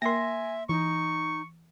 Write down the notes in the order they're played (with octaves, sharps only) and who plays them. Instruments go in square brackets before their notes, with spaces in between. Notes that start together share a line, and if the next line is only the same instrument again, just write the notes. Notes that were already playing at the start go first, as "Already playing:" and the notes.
[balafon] A#3 A#4 [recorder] E5 [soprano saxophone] G#5 [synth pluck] C6 A#6
[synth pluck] E3 [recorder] D#4 [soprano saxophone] C#6